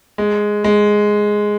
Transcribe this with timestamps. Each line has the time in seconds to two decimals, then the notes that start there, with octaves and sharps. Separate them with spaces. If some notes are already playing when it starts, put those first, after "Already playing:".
0.18 G#3
0.64 G#3